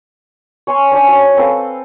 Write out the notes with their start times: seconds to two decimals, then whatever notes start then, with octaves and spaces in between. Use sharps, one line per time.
0.67 C#5 G#5 C6 C#6
0.92 C#4 D4 C5 D5
1.08 F#3 C#6
1.37 C4 A4 B4 F5